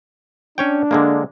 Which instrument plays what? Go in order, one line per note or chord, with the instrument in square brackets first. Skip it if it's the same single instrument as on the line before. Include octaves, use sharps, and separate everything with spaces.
[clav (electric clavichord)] C#4 C#5 G5 [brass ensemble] D4
[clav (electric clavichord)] D3 G#3 A#3